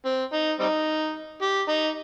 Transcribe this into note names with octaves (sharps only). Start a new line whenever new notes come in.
C4
D#4
G3 C4 D#4
G4
D#4